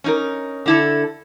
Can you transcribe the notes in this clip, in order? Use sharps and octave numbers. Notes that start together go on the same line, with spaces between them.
C#4 D#4 A#4
D3 E4 A4